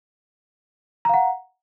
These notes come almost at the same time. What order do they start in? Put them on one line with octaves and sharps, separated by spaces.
A#5 F5 F#5